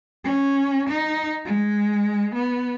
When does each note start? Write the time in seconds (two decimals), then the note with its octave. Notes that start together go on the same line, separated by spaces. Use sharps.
0.24 C#4
0.90 D#4
1.45 G#3
2.35 B3